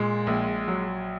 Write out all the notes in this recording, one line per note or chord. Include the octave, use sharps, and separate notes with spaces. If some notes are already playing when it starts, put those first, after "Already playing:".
Already playing: A#2 G#3
A#1
F#3